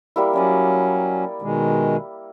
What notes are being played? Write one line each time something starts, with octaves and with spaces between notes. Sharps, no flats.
G3 A#3 E4
F#3 C#4 E4 D5 D#6
B2 D#3 G#3